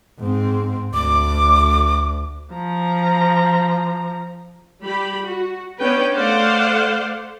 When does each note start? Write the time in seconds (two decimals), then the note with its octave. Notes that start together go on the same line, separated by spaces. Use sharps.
0.20 G#2 C4
0.94 D2 D6
2.54 F3 A#5
4.84 G3 G4 B5
5.26 F#4
5.79 B3 C#4 D4 B4 G5
6.13 A3 C5 D5 F5 F#5